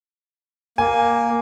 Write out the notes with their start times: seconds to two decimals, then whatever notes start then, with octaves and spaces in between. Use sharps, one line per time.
0.78 A#3 G#5